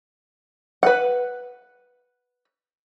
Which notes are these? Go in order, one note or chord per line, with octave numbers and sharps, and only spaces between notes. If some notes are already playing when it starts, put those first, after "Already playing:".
B4 F#5